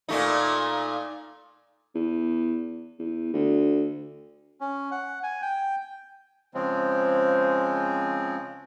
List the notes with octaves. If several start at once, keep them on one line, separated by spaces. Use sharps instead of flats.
A#2 A3 D#4
E2
E2
D2
C#4
F#5
G#5
G5
C#3 F3 G#3 C4